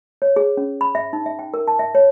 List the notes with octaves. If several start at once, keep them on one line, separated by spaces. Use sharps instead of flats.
C#5
G#4
C#4
B5
E5
D#4
E5
G5
A#4
A5
E5
C#5